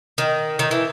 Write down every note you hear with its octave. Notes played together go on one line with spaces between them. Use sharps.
D#3
D#3
E3